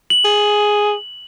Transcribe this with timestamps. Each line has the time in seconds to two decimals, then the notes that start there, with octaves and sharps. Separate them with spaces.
0.10 F#7
0.25 G#4